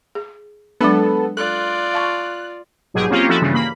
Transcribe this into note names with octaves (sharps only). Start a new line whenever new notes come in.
G#4
F#3 G#3 B3 D4 A4
F4 A4 D5 F#6
F5 A5 C#6
A#1 G#2 B2 F#3 G4 G#4
A#3 C4 C#4 F4 G4
F3 E4 F#4 A4 D#5
G2 C#3 E3
A#3 B5